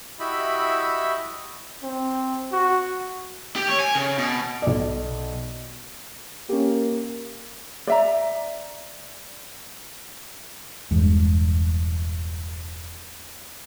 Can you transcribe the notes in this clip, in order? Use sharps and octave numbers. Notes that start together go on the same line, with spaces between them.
E4 F#4 G4 D#5 E5 B5
C4
F#4
G4
C#5
G#5
C#3
B2
B1 D5
A#3 C#4 G4
D5 E5 A#5
E1 E2 G2 G#3